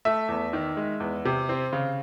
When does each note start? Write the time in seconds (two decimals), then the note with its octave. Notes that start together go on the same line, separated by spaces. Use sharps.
0.05 A3 E5
0.28 E2
0.53 D#3
0.77 G#3
1.00 E2
1.25 C3
1.49 C4
1.73 C#3